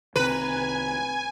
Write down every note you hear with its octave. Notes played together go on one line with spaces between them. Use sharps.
C2 C3 D#3 C4 B4 G#5 A#5